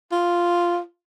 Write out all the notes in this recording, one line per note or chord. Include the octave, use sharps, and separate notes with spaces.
F4